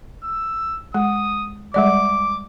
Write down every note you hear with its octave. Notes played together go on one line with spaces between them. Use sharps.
E6
G#3 D#6
G3 G#3 D5 D6